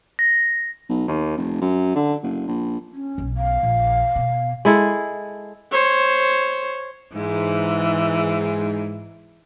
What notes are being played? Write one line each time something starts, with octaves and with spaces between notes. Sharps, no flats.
A#6
B1
D#2
F1
F#2
D3
F#1
A#1
C#4
B1 B2
F5
A#1
B2
G#3 E4 A4
C5 C#5
G#2 E3